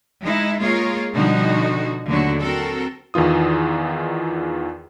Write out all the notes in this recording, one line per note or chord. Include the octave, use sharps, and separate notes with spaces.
G#3 D#4 E4
G#3 A#3 F4 G#4 A#4 C#5
B2 D3 F3 G3 D#4 F#4
D#2 D3 F#3 A3 F#4
C4 F#4 A4 A#4
E2 D#3 E3 F4 D#6